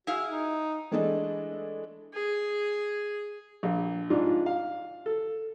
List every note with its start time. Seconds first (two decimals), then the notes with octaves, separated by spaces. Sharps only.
0.07 E4 F#4 G#4 F5
0.30 D#4
0.91 E3 G#3 A3 D4 A4 D#5
2.14 G#4
3.63 A#1
4.10 G#2 D4 F4
4.46 F5
5.06 A4